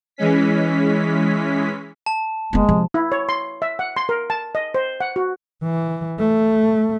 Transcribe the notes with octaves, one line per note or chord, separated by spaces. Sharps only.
E3 G#3 C#4 B6
A5
F#1 G#3 A#3 B3
C3 F3
E4
C#5
C6
E5
F#5
C6
A#4
A5
D#5
C5
F#5
F#4
E3
A3